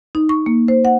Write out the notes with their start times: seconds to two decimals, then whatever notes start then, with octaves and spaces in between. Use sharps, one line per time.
0.15 D#4
0.29 C#6
0.46 A#3
0.68 C5
0.85 F#5